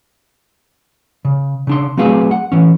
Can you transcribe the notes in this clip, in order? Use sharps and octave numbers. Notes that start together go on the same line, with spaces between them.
C#3
C#3 D4 C6
F#3 A3 C4 F4 G#4 B4
F#5
E3 C#4